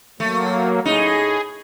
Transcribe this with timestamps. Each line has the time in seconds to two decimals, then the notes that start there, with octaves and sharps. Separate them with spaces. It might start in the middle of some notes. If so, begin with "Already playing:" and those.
0.20 F#3 A3 A#3
0.85 A2 D#4 G#4